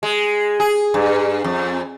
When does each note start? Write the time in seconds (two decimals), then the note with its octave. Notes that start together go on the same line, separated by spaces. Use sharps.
0.03 G#3
0.60 G#4
0.94 G2
1.44 F2